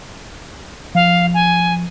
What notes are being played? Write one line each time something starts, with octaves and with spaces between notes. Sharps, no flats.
F3 F5
G#5